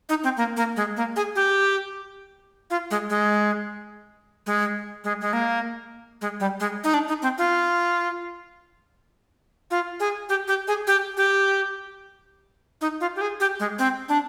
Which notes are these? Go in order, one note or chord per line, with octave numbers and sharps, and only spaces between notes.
D#4
C4
A#3
A#3
G#3
A#3
G#4
G4
F4
G#3
G#3
G#3
G#3
G#3
A#3
G#3
G3
G#3
D#4
D4
D#4
C4
F4
F4
G#4
G4
G4
G#4
G4
G4
D#4
F4
G4
G#4
G4
G#3
C4
D4